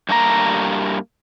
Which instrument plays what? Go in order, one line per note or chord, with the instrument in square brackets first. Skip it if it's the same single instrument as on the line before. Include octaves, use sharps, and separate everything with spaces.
[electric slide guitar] G2 G3 A3 A#3 G4 A#5